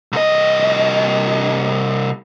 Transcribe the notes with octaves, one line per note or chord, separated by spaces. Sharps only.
C2 D#5